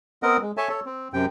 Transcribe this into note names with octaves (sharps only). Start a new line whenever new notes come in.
B3 C4 A#4 D#5 F#5
G#3
A4 C#5 E5 G#5 A5
A4 C#5
C4
F#2 C3 G5